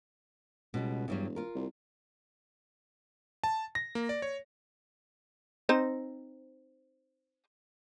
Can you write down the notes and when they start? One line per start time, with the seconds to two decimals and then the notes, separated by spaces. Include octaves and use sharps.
0.74 C#2 B2 G3
1.08 E1 G2 F#3 G3
1.36 F4 A#4
1.55 C2
3.44 A5
3.75 A#6
3.95 A#3
4.09 D5
4.22 C#5
5.69 C4 D#4 C5